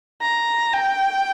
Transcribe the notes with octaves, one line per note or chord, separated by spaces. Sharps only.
A#5
G5